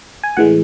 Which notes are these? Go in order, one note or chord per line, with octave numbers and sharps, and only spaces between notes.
G#5
A2 E3 G#3 F#5